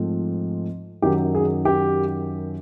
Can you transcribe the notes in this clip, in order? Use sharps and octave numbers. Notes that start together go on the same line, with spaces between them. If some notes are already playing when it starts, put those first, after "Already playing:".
Already playing: G#2 F3 A3 C4
F#2 D#3 F#3 G4
G#4
G4